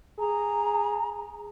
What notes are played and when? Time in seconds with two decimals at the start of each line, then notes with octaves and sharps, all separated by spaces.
0.19 G#4 A#5